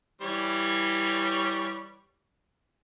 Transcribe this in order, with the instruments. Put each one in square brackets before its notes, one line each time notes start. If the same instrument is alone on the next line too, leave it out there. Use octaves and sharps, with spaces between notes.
[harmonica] E3 G3 C#5